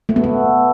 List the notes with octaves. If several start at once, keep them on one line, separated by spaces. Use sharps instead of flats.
A3
B3
A3